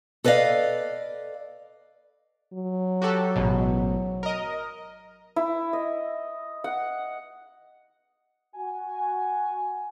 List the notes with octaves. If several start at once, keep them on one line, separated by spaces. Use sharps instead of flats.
A4 B4 D5 D#5 F5
F#3
F#4 G4 A4
A1 G#2 B2
A#4 D#5
E4
D#5
F#5
F#4 G#5